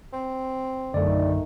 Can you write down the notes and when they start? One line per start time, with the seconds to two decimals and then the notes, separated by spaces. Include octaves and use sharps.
0.13 C4
0.94 A#1 F#2 D3 D#3 A3 D5